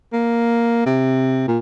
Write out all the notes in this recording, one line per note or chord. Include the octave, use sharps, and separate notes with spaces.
A#3
C3
A#2